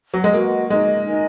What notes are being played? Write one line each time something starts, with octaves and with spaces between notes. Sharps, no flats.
F#3
G#3
A#3 F#4 B4 D#5
G#3 D#4 A#4 D#5
D#4 A#4 D#5 G#5